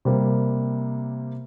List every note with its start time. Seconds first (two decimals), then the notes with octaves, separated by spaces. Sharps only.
0.05 C3 G3 A#3